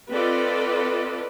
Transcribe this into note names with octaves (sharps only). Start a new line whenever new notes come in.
C4 F4 A4 B4 D5 D#5